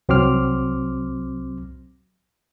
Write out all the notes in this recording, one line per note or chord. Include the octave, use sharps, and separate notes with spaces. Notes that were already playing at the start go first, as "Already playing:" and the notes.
C2 F#3 C4 C6 D6 F6